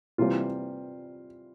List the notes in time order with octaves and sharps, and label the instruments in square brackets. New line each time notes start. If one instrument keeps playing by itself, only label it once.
[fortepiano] C3 E3 G3 C4 F4